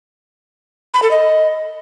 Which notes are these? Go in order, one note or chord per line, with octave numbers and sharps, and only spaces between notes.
B5
A4
D#5